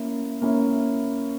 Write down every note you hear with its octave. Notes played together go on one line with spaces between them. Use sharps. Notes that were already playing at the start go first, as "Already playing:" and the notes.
Already playing: A#3 C#4 E4
A#3 C#4 E4